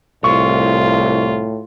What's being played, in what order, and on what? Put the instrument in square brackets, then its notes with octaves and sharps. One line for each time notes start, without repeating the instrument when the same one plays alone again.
[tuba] C2 [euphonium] A2 [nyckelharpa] F4 [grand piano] C#6